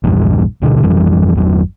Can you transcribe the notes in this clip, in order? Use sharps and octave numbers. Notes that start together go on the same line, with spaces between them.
A#1 E2 G2
D1 B2 D3
G#1 F2 E3 G3
G1 E2 F#3